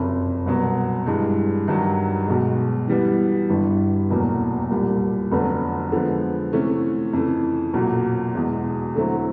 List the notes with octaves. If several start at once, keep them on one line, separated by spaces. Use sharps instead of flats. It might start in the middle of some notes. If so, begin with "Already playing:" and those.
Already playing: F#1 F2 C3
C2 B2 F#3 B3
G2 E3 G#3
G2 D#3 F#3
B1 B2 G#3
E3 G3 B3
G1 G2 E3
F1 E2 B2 F#3 A#3
C2 A#2 G3
F1 F2 D3 F#3 B3
D3 F3 G#3 B3
C3 E3 A3 C#4
F2 C#3 E3
B1 A#2 F#3
E2 B2 G#3
D3 F#3 A3 C4 E4